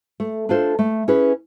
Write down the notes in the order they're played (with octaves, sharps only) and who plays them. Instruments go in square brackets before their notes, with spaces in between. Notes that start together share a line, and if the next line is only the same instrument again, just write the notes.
[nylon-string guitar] A3
D4 F4 A4 C5
A3
C#4 E4 G#4 B4